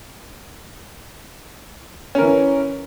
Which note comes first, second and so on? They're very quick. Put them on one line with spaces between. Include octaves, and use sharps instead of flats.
C#4 A#4 E3